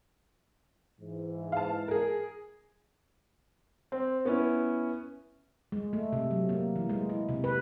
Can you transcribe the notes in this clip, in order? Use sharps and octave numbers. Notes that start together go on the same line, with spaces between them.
G#2 E3
F5 A5
G#4 A#4
C4
B3 C#4 E4
G#3
A3
C3
F#3
A#3
E3
G#3
E4
C3
B4